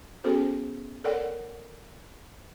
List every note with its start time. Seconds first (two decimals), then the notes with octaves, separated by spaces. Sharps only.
0.24 B3 C#4 F#4 G#4 A4 C5
1.04 A4 A#4 C#5 D5 F#5 G5